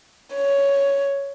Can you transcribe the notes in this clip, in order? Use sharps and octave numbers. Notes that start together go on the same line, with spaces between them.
C#5